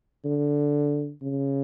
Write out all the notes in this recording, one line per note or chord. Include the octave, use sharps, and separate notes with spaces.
D3
C#3